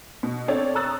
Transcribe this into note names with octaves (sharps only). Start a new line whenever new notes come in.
B2
C4 D4 A4 C#5 D5
A#5 C#6 D#6 E6 F#6 A6